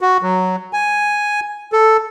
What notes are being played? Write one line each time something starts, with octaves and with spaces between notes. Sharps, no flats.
F#4
F#3
G#5
A4